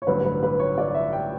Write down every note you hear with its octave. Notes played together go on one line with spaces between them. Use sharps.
C#5
A1 G2 D3 F#3 B4
B4
B4
C#5
D5
E5
G5